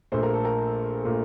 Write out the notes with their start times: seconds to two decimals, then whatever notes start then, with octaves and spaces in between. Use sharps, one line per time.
0.12 A#1 A#2 A3 C5
0.23 A#4
0.34 A4
0.45 A#4
1.04 A#2 A3